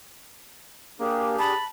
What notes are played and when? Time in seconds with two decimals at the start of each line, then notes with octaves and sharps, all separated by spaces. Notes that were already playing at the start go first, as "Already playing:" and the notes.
1.00 A#3 D4 G4 G#4
1.39 A5 B5